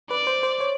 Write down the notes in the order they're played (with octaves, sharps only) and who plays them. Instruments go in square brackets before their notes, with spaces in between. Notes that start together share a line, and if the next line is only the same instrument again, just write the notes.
[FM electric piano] B4 [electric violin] D5
[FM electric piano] C5
C5
C#5